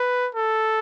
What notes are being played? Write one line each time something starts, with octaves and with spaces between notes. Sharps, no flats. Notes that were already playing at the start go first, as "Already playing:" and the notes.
Already playing: B4
A4